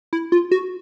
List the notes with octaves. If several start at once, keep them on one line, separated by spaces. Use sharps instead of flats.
E4
F4
F#4